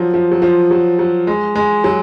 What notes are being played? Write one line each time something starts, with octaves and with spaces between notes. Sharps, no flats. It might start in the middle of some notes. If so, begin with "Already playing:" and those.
Already playing: F3 F#3
F3
F#3
F3
F#3
F#3
G#3
G#3
F#3